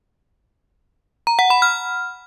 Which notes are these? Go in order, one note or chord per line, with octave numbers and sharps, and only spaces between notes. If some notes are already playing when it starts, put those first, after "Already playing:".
A#5
F#5
B5
F6